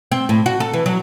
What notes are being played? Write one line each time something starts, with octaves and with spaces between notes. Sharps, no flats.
C4
A2
F#4
A4
E3
F#3